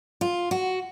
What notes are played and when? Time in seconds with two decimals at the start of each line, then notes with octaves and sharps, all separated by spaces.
0.21 F4
0.51 F#4